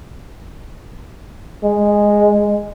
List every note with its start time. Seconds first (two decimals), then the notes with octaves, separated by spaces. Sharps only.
1.64 G#3